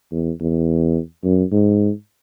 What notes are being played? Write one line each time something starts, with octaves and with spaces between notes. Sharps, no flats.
E2
E2
F#2
G#2